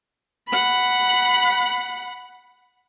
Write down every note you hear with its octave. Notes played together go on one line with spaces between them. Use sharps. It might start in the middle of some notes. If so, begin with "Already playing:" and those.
F#5 B5